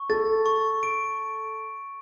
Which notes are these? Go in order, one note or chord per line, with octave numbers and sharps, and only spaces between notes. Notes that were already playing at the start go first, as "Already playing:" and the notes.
Already playing: C#6
A4 A6
C#6
D7